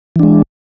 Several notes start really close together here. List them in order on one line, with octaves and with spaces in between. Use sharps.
E3 D4 G#3